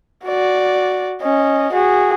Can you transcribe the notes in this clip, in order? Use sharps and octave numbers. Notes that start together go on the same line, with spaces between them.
F#4 D5
C#4 D#5
F#4 G#4